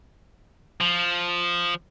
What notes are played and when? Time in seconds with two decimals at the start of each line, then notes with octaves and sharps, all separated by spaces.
0.81 F3